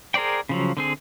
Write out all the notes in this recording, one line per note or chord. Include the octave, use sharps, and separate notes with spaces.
G#4 A#4 C5 D5 G5
C#3 F3 F#3
D3 C4 G#4